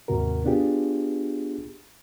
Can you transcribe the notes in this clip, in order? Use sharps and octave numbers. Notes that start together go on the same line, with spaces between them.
D#2 G#2 C3 F#4 A#4
B3 D4 F4 G4 G#4